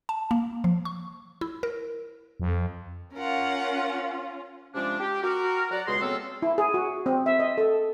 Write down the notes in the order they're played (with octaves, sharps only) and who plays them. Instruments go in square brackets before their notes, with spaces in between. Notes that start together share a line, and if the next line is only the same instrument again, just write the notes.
[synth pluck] A5
A#3
F3
C#6
E4
A#4
[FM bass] F2
[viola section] C#4 F4 [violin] A#4 F#5
[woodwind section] C3 F3 G#3 C#4 D4
G4
F#4 A#4
F#3 D5 F#5 A#5
C#2 B2 G#3 G#4 C6
C#3 F#3 B3 C4 F4 A4
[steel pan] E4
G#4
F#4
C4
E5
D#5
A4